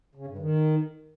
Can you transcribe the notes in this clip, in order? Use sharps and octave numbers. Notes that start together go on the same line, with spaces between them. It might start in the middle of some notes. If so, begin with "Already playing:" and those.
C#3
G2
D#3